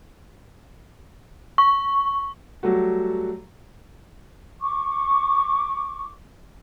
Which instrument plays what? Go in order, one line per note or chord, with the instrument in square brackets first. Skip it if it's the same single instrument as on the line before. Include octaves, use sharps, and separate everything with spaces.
[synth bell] C#6
[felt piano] F#3 G3 A3 F#4
[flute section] C#6 D6